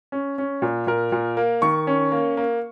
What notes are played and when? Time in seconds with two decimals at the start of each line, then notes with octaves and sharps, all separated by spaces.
0.12 C#4
0.38 C#4
0.62 A#2
0.87 A#2 A#4
1.12 A#2
1.37 A#3
1.62 D#3 C#6
1.87 C#4
2.12 A#3
2.37 A#3